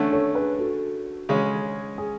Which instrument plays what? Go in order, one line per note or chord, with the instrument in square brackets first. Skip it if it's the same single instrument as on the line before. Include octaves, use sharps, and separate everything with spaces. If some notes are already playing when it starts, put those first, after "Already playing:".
Already playing: [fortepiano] D3 A3 C#4
[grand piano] A4 C#5
G#4 B4
F#4 A4
[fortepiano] C#3 G#3 C#4
[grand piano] G#4